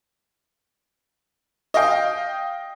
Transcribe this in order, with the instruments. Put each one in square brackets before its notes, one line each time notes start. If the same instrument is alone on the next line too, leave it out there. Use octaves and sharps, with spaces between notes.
[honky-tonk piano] D#5 F5 G5